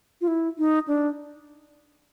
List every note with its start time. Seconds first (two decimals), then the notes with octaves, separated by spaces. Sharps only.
0.21 F4
0.28 E4
0.58 D#4
0.88 D4